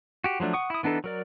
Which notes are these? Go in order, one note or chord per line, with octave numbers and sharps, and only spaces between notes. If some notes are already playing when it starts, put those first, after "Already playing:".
F#4 G4
F3 F#3 A3 D4
F#5 C#6 D#6
E4 D#6
E3 B3 D4 D#4 A4
F#3 A#4 D5